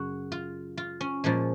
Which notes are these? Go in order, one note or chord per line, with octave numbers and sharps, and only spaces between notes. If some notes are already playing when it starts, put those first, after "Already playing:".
Already playing: F#2 C#3 F#4
F4
F4
C#4
A#2 F3 G#3 C#4